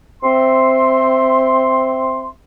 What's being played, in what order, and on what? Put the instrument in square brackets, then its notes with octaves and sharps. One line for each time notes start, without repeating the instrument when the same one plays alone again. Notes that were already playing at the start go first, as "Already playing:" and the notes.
[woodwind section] C4 E5 C6